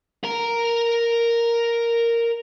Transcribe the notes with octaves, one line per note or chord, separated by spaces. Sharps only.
A#4 A#5